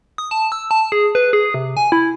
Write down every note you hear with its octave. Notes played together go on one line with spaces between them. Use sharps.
D#6
A5
E6
A5
G#4
B4
G#4
C3
G#5
E4